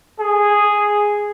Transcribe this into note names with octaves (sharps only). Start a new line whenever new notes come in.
G#4